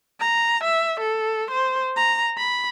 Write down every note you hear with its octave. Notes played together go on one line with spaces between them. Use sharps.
A#5
E5
A4
C5
A#5
B5